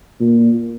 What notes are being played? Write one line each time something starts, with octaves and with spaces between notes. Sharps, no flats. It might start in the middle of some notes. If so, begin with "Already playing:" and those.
A#2